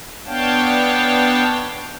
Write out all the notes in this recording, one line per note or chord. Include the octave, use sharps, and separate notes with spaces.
B3 D4 C#5 F5 G5 A5